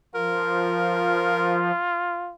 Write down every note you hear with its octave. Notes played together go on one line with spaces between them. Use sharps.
F3 F4 A#4